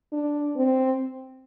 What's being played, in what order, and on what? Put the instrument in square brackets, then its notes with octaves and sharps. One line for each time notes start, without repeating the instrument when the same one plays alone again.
[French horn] D4
C4